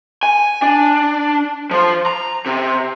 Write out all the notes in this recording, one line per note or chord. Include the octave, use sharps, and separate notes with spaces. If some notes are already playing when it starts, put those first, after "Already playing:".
G#5
D4
F3 C5
A#5
C3